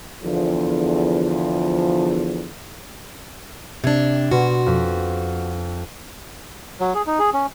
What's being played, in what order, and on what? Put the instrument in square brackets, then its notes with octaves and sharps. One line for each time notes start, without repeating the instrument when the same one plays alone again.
[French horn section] E2 D3 F3
[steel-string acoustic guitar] C3 D4 [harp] G#6
[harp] B2 C6 [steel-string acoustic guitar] F#4
[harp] F2
[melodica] F#3
G#4
D#4
G#4
C#4